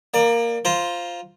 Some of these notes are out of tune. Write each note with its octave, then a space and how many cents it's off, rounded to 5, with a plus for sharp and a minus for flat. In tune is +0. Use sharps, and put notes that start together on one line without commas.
A#3 +0 D5 +30
F4 +0 C5 +0 A#5 +20